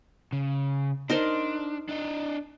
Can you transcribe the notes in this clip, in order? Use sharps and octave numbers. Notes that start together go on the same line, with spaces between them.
C#3
D4 D#4 A#4 C5
D4 D#5